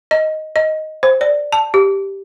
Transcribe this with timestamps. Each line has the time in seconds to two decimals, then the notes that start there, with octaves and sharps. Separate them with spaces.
0.11 D#5
0.56 D#5
1.03 C5
1.21 D5
1.53 A5
1.74 G4